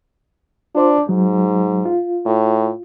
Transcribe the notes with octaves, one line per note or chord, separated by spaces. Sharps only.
D4 F4 C5 D5
G#2 F#3
F4
A2